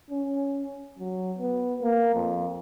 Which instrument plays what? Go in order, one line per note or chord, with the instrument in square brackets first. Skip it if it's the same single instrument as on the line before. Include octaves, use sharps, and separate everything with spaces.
[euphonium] C#4
F#3
B3
A#3
F2